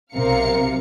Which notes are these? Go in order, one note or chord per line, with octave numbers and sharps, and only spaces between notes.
B1 C3 A#4 F5 C#7